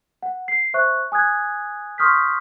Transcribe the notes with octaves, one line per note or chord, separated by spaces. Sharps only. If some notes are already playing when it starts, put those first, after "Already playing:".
F#5
C7
C5 E5 C#6 F#6
G#5 D#6 F#6 G#6
C6 C#6 D#6 F6 G6 B6